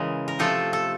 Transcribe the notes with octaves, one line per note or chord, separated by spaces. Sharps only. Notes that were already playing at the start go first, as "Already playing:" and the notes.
Already playing: C#3 E3 G#3 A#4
A#4
C3 F3 A3 A4
A4